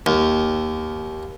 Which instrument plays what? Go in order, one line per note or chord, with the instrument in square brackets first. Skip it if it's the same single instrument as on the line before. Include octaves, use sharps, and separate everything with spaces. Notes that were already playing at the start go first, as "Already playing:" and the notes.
[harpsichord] D#2